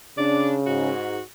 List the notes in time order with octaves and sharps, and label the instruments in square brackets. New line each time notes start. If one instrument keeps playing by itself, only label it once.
[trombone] C#3 [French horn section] D4 [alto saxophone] D5
[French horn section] G#2 [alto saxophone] F#4